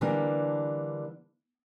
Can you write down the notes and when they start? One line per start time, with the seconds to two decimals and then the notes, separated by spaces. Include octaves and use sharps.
0.01 D3 E3 G3 A#3 D4